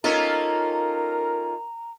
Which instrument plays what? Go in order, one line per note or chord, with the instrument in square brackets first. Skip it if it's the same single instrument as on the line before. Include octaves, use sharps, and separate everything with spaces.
[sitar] A#3 C#4 F4 [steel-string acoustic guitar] D#4 A4 [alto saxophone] A#4 [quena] A#5